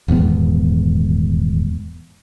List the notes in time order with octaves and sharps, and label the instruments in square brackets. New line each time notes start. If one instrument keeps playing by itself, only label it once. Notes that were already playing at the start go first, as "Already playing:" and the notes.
[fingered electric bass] D#1 E2 G#2 B3